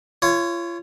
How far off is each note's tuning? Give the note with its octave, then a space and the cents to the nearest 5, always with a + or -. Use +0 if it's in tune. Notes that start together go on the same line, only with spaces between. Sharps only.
F4 -35 C#5 +0